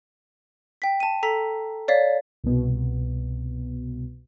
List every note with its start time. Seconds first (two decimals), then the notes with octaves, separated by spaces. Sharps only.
0.82 G5 B6
1.00 A5 D#7
1.23 A4 A#5 B6
1.88 C#5 D5 F5 B6
2.44 C2 B2